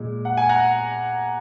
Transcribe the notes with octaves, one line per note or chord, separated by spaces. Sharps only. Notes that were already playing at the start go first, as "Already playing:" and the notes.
Already playing: A#2 G#3
F#5
G#5
F#5 A#5